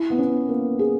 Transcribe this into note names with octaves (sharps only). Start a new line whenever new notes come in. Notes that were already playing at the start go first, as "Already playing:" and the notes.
Already playing: E4
B3
C#4
A#3
G#4